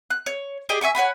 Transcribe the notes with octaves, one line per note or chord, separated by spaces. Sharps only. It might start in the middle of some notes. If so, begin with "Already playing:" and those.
F#6
C#5
G4 G#4 D5 D#5
E5 G#5 C#6 D6
C#5 F#5 G#5 B5